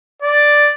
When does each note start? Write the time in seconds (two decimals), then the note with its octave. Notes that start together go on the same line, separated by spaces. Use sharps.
0.22 D5